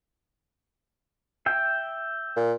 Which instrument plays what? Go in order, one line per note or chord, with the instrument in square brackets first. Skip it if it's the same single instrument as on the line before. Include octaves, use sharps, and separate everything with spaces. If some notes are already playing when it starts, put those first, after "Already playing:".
[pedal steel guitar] E5 G5
[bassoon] A#2